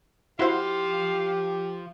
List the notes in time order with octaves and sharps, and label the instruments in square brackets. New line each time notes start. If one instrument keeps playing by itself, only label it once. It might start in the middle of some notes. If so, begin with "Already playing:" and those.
[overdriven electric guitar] F3 C6 [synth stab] E4 F#4 C5 [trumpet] G4 [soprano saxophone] F5